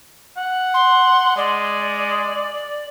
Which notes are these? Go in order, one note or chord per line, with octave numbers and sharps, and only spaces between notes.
F#5
C6
G#3 D5